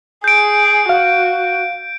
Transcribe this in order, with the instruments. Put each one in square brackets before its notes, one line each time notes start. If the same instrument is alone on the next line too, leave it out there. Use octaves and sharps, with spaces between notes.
[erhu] G#4 [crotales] G6 D7
[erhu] F#4 [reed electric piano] F5